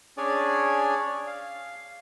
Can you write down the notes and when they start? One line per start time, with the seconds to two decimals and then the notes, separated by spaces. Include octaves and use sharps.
0.17 C#4 D4 G#4 C#5 D5 G#5
1.27 F5